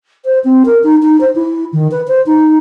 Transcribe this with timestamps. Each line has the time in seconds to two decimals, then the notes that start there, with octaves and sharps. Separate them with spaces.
0.25 C5
0.44 C4
0.65 A#4
0.84 D#4
1.02 D#4
1.21 C5
1.35 E4
1.73 D#3
1.91 B4
2.08 C5
2.26 D#4